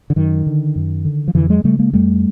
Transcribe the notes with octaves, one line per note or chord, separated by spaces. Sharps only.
D3
F#2 D#3
D3
F#2
D3
F3
F2 D3 E3
F#3 G#3
C#3 G3 A3
G#3 A#3
F2 G3 A3